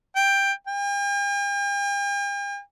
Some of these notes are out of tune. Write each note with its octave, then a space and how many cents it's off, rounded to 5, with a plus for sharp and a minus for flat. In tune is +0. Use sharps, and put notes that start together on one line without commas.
G5 +10
G5 +45